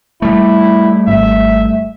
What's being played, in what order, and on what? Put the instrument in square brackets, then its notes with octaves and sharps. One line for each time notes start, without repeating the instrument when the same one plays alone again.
[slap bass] G3 A3 [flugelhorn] E4
[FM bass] G#1 [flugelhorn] E5